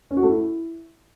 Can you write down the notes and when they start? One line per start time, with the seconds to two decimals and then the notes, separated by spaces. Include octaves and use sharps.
0.11 C#4
0.17 F#4
0.23 A3
0.29 E4